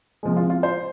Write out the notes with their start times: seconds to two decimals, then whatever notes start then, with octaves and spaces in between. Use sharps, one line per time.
0.23 C3 F3 G#3
0.37 F4
0.50 F4
0.63 C5